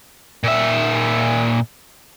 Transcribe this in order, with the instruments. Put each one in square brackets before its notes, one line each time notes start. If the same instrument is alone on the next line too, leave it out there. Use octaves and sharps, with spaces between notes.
[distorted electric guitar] A#2 E5